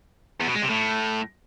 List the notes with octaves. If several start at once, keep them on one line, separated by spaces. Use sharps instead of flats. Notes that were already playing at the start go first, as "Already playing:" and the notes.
E2
B2
G#3
C3
A2